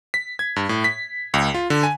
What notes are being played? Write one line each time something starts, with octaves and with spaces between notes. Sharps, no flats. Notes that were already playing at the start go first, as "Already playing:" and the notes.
B6
G#6
G2
A2
B6
C#2
F4
D3
G#5